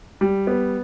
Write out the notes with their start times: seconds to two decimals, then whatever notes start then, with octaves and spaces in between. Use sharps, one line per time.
0.21 G3
0.47 B3